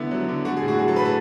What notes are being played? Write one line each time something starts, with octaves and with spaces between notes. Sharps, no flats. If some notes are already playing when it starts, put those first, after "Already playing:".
Already playing: D3 B3 E4
F#3
D3
A3 F#4
G#4
A2
F#4
F#3 G#4
A4
A2 B4
A4